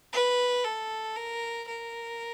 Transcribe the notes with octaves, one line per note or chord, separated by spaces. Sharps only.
B4
A4
A#4
A#4